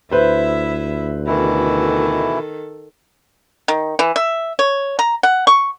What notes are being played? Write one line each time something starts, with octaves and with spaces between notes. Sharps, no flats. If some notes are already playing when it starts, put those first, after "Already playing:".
D2 E4 B4 C5 E5
B2 D#3 E3 E4 A4
D#3
E3
E5
C#5
A#5
F#5
C#6